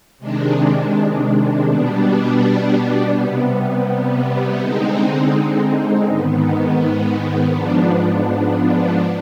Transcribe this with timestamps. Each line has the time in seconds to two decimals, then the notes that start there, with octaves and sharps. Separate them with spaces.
0.19 C3 D#3 G#3 D4
1.65 B2 G3 B3 D4
3.12 C3 G3 B3
4.58 D3 G#3 C4 D#4
6.04 G#2 D#3 B3
7.50 G#2 F3 B3 D4